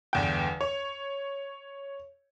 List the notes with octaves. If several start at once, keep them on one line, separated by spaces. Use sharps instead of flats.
G1 E2 G5
C#5